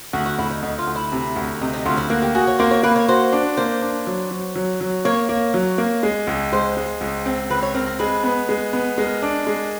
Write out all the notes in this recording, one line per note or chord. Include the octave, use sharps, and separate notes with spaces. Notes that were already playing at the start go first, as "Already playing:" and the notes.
D2 F#4
F#4
D2 E4
D#4
D2 D#4
F4
D2
E4
C3
D2
C3 D#4
D#4
D2 F4
E4
A#3 F#4
G4
F#4 G#4
C#5
A#3 C5
C#5
A#3 B4
C#5
F#4 C5
D4
A#3 C5
D4
F#3
F#3
F#3
F#3
A#3 C#5
A#3
F#3
A#3
G#3
C#2
G#3 C5
G#3
C#2
C4
C#2 B4
C#5
C4 A#4
A#4
G#3 B4
B3
G#3
B3
G#3 A#4
D4
G#3